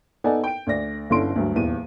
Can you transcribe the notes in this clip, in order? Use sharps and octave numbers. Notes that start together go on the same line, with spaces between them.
B3 D#4 A4 D5 F#5 G#5
G5 D7
D2 D5 A#6
G1 D3 C#4 E4 C6 D7
D2 G2 F#3
D#1 E2 D#7